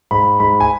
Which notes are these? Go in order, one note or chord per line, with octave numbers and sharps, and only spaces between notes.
G#2 B5
G#2 B5
G#5